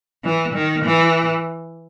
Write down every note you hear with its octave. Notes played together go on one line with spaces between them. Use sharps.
E3
D#3
E3